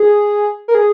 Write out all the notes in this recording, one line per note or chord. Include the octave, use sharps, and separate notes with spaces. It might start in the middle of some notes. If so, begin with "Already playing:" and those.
Already playing: G#4
A#4
G#4